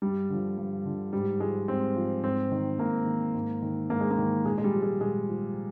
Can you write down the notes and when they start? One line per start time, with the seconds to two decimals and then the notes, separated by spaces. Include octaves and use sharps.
0.02 G2 G3
0.29 D3 F3
0.58 G2
0.85 D3 F3
1.13 G#2 G3
1.40 F3 G#3
1.68 G#2 C4
1.96 F3
2.23 G#2 C4
2.52 D#3
2.79 G#2 A#3
3.06 D#3
3.34 G#2
3.62 D#3
3.90 G#2 A#3
4.00 G#3
4.11 A#3
4.18 D#3
4.45 A#2 G#3
4.58 G#3
4.64 G3
4.73 F3
4.82 G#3
5.01 A#2 G#3
5.28 F3